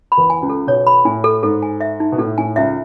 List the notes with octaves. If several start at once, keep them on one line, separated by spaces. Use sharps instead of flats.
B5
E2 E3
G#5
C#2 C#3
A4
B1 B2 C#5
B5
A2 G#5
A4
G#2 A4
G#5
E5
D#4
B2
A2 A4
A2 G#5
C#2 C#3 E5